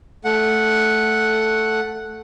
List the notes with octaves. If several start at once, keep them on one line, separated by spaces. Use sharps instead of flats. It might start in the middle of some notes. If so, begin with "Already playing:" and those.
A3 F#5